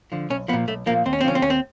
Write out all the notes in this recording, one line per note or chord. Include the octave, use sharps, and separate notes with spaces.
D3 F3
B1 C#4
A#2 F3 B3
B1 A3
A#2 F3 A#3
D#2 C4
C#4
C4
D3 F3 C#4
C4
D#2 C#4
C4